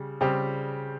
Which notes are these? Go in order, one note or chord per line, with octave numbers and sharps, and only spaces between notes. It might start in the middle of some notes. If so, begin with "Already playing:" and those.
Already playing: C#3 G3
C#3 G3 C4 G4